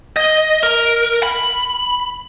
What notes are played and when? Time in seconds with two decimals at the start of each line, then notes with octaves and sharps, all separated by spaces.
0.17 D#5
0.63 A#4
1.23 B5